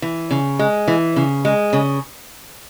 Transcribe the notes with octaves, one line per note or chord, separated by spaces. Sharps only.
E3
C#3
G#3
E3
C#3
G#3
C#3